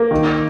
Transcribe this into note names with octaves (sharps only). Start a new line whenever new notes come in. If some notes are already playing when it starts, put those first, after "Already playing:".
Already playing: A#3
D#3